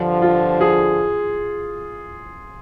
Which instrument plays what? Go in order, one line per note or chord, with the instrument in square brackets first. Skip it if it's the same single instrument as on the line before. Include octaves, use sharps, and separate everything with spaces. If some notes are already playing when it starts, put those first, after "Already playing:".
Already playing: [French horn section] G2 D3 F3
[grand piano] F4
G#4